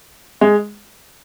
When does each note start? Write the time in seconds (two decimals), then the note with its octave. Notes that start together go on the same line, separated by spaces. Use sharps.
0.41 G#3